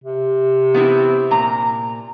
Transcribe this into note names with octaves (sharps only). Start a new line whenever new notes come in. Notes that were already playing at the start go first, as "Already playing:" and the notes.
C3
B3 C4 E4
A#2 A#5